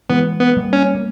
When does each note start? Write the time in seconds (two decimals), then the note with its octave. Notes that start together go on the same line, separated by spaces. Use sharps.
0.10 E3 G#3 B3
0.41 B3
0.57 G3 A#3
0.73 C#4
0.95 A#3